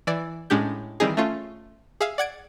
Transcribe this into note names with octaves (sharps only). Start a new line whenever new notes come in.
E3 D5
A2 G#3 C#4 D4 G4 G6
D#3 E3 G3 C4 D#4 G#4
A3 C#4 F4
G#4 E5 F5
D5 F#5 G#6 D7